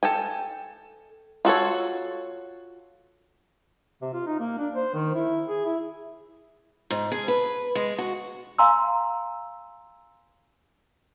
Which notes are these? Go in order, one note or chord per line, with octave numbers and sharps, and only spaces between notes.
A4 G5 G#5
F4 F#4 A4 C#5
C3
F4
D#4
A#3
D4
C5
D#3
E4
G#4
E4
G#2
G#4
B4
G#3
F#4
F5 G#5 A#5 C6 E6